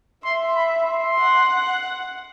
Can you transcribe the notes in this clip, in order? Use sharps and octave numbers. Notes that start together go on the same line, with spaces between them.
E5 C6
B5
C6
F#5